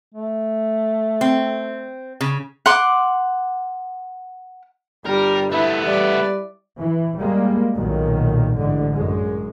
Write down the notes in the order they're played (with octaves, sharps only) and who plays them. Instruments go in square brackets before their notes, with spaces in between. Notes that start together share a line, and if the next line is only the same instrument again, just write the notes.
[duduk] A3
[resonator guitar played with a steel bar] C4
C#3
[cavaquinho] F#5 C6 D6
[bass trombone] G1 [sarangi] G3 [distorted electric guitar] A#4
[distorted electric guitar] A3 B3 [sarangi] E4 [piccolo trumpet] B4
[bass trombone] G3 [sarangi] D5
[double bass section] E3
G3 G#3 A#3
B1 A#2 D#3 F#3
A1 G#2 D3
F#2 G#3